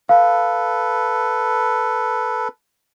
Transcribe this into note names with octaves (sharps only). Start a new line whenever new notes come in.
A4 B4 F5